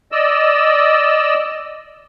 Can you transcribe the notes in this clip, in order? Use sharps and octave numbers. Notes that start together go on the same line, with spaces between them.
D5 D#5 E6